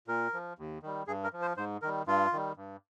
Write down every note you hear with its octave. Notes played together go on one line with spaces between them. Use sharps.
A#2 A#4
F3
D#2
D#3 G3
G2 G#4
A#4
F3
C5
G#2 C5
D#3 G3 A#4
G2 F4
D#3 G3
G2